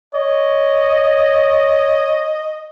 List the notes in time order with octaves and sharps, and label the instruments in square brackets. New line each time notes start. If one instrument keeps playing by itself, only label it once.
[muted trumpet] C#5 [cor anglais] D#5